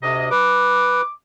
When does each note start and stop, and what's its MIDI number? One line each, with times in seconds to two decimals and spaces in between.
0.02 0.29 38
0.02 0.29 48
0.02 0.29 75
0.31 1.01 71
0.31 1.10 86